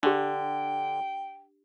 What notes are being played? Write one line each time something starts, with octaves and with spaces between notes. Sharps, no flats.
D3 D4 G4 G5